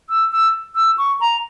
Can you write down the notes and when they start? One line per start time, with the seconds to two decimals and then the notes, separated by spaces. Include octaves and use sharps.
0.10 E6
0.32 E6
0.75 E6
0.98 C#6
1.21 A#5